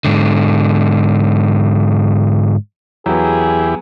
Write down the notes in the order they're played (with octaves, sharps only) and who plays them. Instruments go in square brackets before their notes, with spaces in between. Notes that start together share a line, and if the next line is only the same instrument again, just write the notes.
[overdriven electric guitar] G#2 D3
[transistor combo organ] E2 E4 G4 [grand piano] F#3 B3 [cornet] G#4